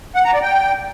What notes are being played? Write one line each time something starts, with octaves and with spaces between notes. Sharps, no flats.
F#5
A#5
D5
G5